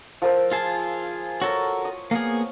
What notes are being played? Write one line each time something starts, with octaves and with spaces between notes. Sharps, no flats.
F3 A#4 E6
F4 G#4 A5
F#4 A4 A#4 C#5
D#6
A#3 B3 G#4 F5